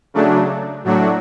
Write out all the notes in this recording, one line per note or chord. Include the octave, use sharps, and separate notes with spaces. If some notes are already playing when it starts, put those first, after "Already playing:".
C#3 F#3 A3 D4
A2 F#3 A3 D4 F#4